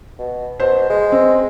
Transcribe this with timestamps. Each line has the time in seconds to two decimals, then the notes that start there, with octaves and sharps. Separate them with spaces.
0.19 B2
0.60 B2 C5
0.90 G#3
1.12 C4